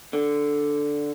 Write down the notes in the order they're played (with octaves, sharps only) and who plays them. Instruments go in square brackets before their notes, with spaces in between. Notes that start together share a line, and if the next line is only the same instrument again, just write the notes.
[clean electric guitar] D3